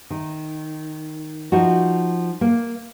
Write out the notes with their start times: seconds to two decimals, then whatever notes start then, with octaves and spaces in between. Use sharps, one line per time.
0.10 D#3
1.52 F3 D#4 F#4
2.41 A#3